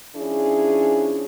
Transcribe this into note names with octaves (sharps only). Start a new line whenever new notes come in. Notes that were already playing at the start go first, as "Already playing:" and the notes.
F3 C#4 D4 E4 G#4